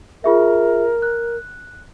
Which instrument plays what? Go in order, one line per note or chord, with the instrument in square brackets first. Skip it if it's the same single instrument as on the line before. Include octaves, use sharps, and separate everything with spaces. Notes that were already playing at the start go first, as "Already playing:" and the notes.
[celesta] F4 G#4 E5 [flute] A#4
[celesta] F#6